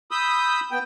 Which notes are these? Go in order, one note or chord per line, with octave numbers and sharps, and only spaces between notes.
B5 D#6 E6 G6
B3 G5